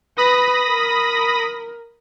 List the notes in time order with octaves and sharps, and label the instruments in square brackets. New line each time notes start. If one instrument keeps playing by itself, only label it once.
[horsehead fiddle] B4 [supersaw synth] B5 D#6 A#6
[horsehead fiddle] A#4